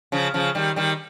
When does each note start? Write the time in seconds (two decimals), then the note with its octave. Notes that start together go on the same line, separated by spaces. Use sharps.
0.12 C#3 F3
0.34 C#3 F3
0.55 D#3 G3
0.76 D#3 G3